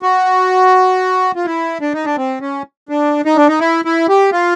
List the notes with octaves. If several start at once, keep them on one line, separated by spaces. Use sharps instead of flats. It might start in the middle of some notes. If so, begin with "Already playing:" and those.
F#4
F4
E4
D4
D#4
D4
C4
C#4
D4
D#4
D4
D#4
E4
E4
G4
F4